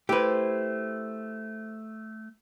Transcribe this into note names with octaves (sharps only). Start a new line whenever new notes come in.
A3 E4 G4 B4 C5